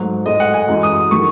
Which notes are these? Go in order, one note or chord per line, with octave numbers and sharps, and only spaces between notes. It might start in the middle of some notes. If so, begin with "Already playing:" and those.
Already playing: G#2 F#3 A3
A2 G#3 D#5
F#5
G#5
F#2 E3 G#3
D#6
D#3 F#3 A3 C#6